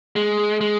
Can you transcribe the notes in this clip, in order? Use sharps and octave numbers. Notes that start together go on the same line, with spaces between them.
G#3
G#3